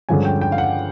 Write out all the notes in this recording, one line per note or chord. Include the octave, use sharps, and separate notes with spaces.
G2 D3 F3 G#3 C#4 G#5
G5
G5
F5
F#5